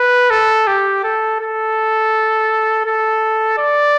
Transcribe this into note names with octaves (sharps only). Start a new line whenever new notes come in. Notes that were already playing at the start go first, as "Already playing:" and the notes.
Already playing: B4
A4
G4
A4
A4
A4
D5